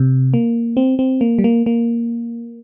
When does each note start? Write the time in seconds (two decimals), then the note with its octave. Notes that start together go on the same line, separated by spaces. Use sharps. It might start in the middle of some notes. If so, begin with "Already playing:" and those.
Already playing: C3
0.34 A#3
0.77 C4
0.99 C4
1.21 A#3
1.38 G3
1.44 A#3
1.66 A#3